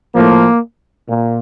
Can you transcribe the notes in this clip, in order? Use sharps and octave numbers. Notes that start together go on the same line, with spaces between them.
A2 F3 A#3
A#2